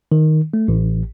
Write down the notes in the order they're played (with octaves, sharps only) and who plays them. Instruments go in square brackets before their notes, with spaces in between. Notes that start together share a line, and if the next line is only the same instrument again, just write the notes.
[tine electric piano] D#3
A3
A1